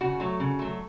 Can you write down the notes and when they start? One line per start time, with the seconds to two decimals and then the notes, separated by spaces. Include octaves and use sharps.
0.01 C#3 F#4
0.20 F#3 A3
0.40 C#3
0.59 F#3 A3